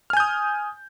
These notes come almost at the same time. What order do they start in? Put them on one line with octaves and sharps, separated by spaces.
F6 G#5 G6 D#6